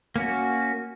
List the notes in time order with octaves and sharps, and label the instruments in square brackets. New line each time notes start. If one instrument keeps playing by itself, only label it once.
[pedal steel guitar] A#3 C#4 F#4